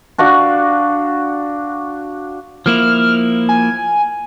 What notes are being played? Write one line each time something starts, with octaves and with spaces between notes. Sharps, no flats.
D4 F#4 F5
F3 A#3 E4 F6
G#5